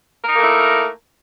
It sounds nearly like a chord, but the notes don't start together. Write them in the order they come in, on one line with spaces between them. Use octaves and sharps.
A#4 D#4 A#3 A3 E4